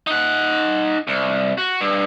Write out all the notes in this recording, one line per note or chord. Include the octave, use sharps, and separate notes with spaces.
D#4 F#5
C2
F#4
G2